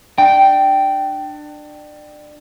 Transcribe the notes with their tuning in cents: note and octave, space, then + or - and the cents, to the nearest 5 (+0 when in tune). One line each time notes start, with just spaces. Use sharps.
D4 +25 G5 -10